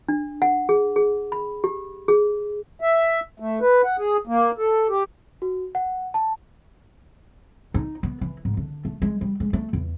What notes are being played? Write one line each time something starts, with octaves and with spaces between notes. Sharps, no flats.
D4
F#5
G#4
G#4
B5
G4
G#4
E5
A3
B4
F#5
G#4
A#3
A4
G4
F#4
F#5
A5
D#4
B3
E3
G#2
D3
A3
G#3
G3
G#3
A3
E2